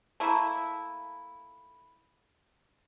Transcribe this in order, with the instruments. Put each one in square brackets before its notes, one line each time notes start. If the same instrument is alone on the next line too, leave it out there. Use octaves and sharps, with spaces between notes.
[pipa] A3 A#3 E4 [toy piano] A5 A#5